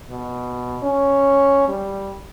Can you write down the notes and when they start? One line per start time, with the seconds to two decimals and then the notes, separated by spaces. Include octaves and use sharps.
0.10 B2
0.83 C#4
1.68 G3